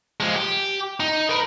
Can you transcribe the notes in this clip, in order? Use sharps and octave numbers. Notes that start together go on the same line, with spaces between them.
F3 G#3
G4
D#4
A#4 B4